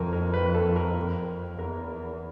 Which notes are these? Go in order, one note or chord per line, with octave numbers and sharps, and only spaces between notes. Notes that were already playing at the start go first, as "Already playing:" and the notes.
Already playing: F2 A4 A#4
A#4
B4
A4
A#4
F2
E2 A#4